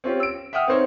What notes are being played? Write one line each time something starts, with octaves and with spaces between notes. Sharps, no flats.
C4 C#4 F4 G4
E6 D7
E5 F#5 G5 D#6 F6
C4 D#4 C5 C#5